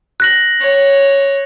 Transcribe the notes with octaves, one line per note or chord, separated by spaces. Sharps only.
F#6 A#6 F#7
C#5